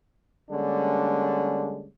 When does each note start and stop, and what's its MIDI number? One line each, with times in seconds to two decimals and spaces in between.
0.51 1.88 50
0.51 1.88 55
0.51 1.88 56
0.51 1.88 58
0.51 1.88 61
0.51 1.88 62